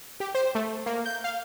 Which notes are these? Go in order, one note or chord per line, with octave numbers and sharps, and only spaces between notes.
G4
C5
A3
A#3
G6
F5